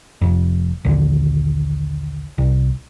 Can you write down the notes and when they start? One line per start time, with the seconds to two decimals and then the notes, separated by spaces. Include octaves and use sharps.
0.22 F1 F2
0.85 A#1 D#2 D3
2.38 C2